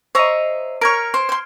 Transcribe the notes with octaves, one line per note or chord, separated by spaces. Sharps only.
C5 C#5 D#5 E5 A#5
A#4 C#5 F6 G#6 D7
C5
C5 C6